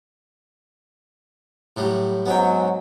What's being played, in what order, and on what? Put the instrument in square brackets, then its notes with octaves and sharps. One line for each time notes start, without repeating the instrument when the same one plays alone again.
[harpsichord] A2 F#3 G3
[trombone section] G#2 F#3 [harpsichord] B3 C#4 G5